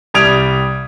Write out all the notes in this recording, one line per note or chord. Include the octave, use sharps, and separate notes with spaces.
C2 G3 D#6 G#6 D7 F7